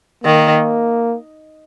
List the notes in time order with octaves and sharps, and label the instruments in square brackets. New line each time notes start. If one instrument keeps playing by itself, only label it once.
[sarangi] D#3 [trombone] A#3